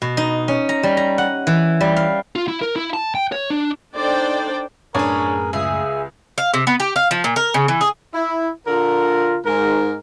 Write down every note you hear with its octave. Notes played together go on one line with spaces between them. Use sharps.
B2
D#4
C#4
A#5
G3
A#5
F#5
E3
G3
F5
F4
E4
A#4
E4
A5
G5
C#5
D4
D4 D#4 A4 C5 D5 G5
F#2 A2 C#4 D4 G#4 A#4 B4 C#5
C#2 G#4 E5
F5
C3
B3
G4
F5
F3
A#2
A#4
C#3
E3
G#4
E4
D3 F4 A#4
G#2 A#4